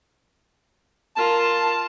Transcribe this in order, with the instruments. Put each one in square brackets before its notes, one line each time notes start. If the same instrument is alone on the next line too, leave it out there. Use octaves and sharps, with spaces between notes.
[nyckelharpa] F4 A#4 [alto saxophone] A5